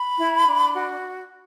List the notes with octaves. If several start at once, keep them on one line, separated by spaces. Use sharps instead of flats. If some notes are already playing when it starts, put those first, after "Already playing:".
Already playing: B5
E4
D4
F#4